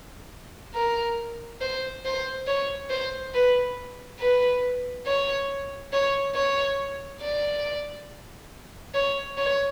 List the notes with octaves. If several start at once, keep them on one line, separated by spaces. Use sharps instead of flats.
A#4
C5
C5
C#5
C5
B4
B4
C#5
C#5
C#5
D5
C#5
C#5